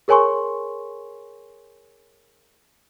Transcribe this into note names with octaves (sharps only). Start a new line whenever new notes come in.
G#4 A#4 C#5 G#5 C6 C#6